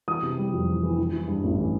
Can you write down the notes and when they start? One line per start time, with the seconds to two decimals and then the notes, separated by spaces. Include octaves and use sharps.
0.08 E3 D#6
0.22 C3
0.38 G3
0.53 F2
0.68 E3
0.83 E3
0.98 E3
1.13 E3
1.28 G2
1.44 A1
1.58 E3